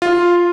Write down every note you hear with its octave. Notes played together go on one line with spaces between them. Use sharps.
F4